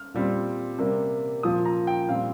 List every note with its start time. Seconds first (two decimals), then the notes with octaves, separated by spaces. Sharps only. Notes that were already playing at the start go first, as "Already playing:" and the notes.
Already playing: F6
0.14 A#2 G3 C4
0.79 C3 G3 A#3
1.43 A#2 F3 A#3 D#6
1.65 A#5
1.87 G5
2.08 A#2 G3 C4 F5